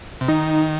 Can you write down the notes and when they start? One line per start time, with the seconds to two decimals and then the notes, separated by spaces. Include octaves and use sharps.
0.21 C3
0.28 D#3 D#4